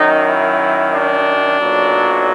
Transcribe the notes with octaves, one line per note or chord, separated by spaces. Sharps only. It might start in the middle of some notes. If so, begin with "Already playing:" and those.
Already playing: F#2 D#3 F#3 D#4
E4
D4
B1 A#2 F#3